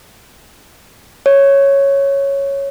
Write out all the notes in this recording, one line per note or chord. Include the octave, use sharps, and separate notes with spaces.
C#5